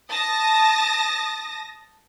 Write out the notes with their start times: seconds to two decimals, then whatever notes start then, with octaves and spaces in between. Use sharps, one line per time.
0.11 A5 D#6 A#6